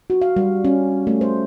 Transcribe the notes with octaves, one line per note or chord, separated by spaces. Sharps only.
F#4
F5
G3
C#4
A3
C5